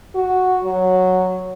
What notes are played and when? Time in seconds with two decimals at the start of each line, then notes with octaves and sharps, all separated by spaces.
0.15 F#4
0.64 F#3